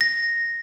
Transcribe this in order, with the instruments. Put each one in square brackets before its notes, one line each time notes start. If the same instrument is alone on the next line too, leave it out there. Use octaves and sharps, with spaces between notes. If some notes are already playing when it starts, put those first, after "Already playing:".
[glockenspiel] A#6